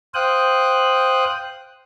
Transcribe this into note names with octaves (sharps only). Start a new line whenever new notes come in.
C5 F5 G5 D#6 F#6